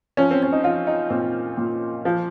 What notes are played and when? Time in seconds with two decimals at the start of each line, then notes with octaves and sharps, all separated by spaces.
0.17 F3 C#4
0.31 C4
0.43 C#4
0.52 D#4
0.64 F3 F4
0.87 D#4
1.10 A#2 C4
1.57 A#2
2.05 F3